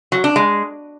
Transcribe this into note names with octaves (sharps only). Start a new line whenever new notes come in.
F#3
D4
G#3